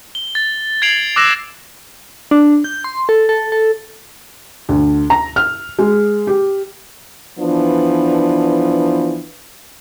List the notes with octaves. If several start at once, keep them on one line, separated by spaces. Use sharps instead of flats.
G7
A6
G#6 A6 C7 D7 F7 F#7
D6 E6 F#6 A#6 E7 F7
D4
G6
C6
A4
A4
A4
D2
A#5
F6
G#3
G4
E3 F3 B3 D4